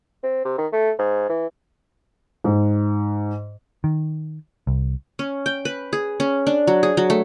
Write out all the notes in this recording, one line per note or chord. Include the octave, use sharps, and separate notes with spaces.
C4
C3
D#3
A3
G#2
E3
G#2
D#3
C2
C#4
G5
B4
G#4
C#4
D4
F#3
G#4
F#3
A3